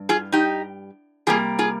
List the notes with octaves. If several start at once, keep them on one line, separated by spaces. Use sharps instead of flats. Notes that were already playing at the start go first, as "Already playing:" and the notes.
Already playing: G2
F4 G#4
D#4 G4
C3 G3 A#3 F4 G#4
F4 G#4